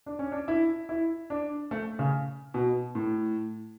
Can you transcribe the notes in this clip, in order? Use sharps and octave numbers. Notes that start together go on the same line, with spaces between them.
D4
C#4
D4
E4
E4
D4
A3
C#3
B2
A2